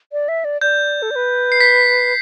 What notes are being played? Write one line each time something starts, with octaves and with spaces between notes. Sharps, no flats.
D5
E5
D5
D5 G6
A4
D5
B4
C7
B6